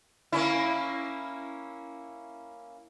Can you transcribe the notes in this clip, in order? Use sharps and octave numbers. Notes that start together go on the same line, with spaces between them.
A#3 C#4 E4